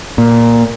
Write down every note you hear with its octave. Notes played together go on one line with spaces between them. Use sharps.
A#2